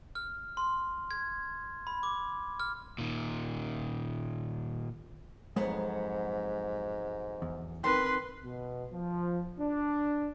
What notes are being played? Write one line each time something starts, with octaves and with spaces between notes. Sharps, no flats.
F6
C6
G#6
B5
D6
F6
A#2 D#3
F2 G#2 F#3 G#3 B3
E2
D#3 C4 B4 G5 C6
B2
F3
D4